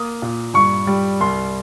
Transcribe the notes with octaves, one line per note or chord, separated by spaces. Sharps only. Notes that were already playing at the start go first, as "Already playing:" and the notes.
Already playing: A#3 D#6
A#2
G2 C#6
G3
C2 C6